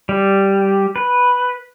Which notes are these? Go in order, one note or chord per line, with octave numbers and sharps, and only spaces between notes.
G3
B4